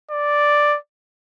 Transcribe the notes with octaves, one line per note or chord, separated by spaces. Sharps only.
D5